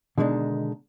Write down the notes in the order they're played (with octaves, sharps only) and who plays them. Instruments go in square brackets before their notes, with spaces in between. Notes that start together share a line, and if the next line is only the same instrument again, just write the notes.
[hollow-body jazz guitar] B2 D3 D#3 G#3 D4 D#4